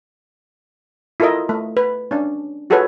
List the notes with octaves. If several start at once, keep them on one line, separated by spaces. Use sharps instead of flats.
E4 F4 A4 A#4 D#5 E5
A3
B4
C#4 D4
F4 F#4 G#4 A4 B4 C#5